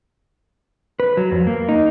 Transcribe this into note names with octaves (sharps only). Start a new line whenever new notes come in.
B4
F#3
F2
A#3
D#4